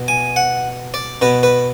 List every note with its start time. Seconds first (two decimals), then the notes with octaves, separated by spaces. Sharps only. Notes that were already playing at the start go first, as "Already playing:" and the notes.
Already playing: B2
0.08 G#5
0.36 F#5
0.94 D5
1.22 B2 B4
1.43 B4